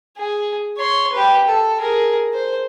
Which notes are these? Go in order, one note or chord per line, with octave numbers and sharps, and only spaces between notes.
G#4
C#5 C6
G4 B4
A4
G#4 A#4
C5